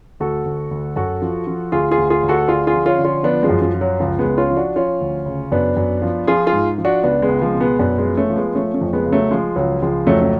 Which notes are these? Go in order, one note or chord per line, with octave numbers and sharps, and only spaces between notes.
D2 F#4 A4
D2
D2
F#2 F#4 A4
F3
F3
D2 F4 G#4
F4 G#4
D2
F4 G#4
D2
F#4 A4
D3 F4 G#4
F4 G#4
F3
C#4 F4
D3
C#4 F4
F3 B3 D4
F3 G#3
F#2
F3
F3
F#3
C#2 F3
G#3 B3
C#2
C#4 F4
F3
D4 F#4
F3 C#4 F4
D2
C#3
F#2 B3 D4
F#2
F3
F3 F4 G#4
F4 G#4
G#2
F3
D4 F#4
C#2 B3 D4
G#3 B3
C#2
F3 G#3
B2
G#3 B3
F#2 B3 D4
G#3 B3
F3
A3 C#4
F3
G#3 B3
F3 A3 C#4
A3 C#4
F2
G#3 B3
C#3
F#3 A3
F3 G#3
C#2 F#3
C#2 F3 G#3
F2 F#3 A3
A3